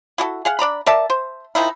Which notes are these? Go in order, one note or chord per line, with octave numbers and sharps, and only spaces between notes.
E4 F#4 G4 A4
G#4 F5 F#5
D4 D5 A#5 B5
A#4 D5 E5 A5
C5
D#3 F3 D#4 E4